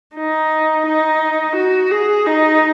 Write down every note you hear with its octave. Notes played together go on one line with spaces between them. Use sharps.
D#4
D#4
F#4
G#4
D#4